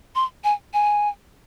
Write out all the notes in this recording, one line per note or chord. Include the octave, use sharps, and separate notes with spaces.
C6
G#5
G#5